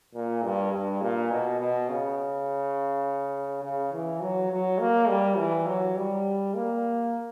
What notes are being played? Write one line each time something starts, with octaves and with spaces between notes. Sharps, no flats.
A#2
G2
G2
A#2
B2
B2
C#3
C#3
E3
F#3
F#3
A#3
G3
E3
F#3
G3
A#3